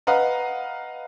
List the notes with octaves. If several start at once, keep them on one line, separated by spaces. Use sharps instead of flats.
B4 D#5 F5 F#5 A#5